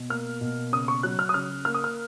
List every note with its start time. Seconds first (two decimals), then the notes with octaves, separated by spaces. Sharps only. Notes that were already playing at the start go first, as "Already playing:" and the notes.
Already playing: B2
0.10 A#3 F6
0.41 B2
0.72 C#3 D#6
0.88 C#6
1.03 F#3 F#6
1.19 F6
1.29 D#6
1.34 C#3 F6
1.65 A#3 F6
1.75 D#6
1.84 F6